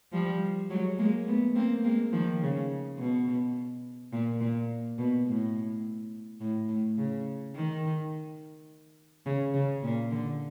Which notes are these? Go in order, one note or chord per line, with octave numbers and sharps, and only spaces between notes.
F3 G3
F#3 G#3
G#3 A#3
A3 B3
A#3 C4
G#3 A#3
D#3 F3
C#3
B2
A#2
A#2
B2
A2
A2
A2
C#3
D#3
C#3
C#3
A#2
D3